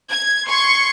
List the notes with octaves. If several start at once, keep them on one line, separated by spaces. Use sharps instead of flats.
G#6
C6 C#6 G#6